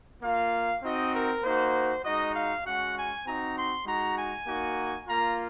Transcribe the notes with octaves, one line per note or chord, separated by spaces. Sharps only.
A#3 F4 F5
C4 D#4 F#4 D#5
A#4
A#3 D#4 F#4 C5
G#3 D#4 F#4 D#5
F5
G#3 C#4 F#4 F#5
G#5
C4 D#4 F#4 A#5
C6
G#3 D#4 F#4 A#5
G#5
A#3 D#4 F#4
A#3 F4 A#5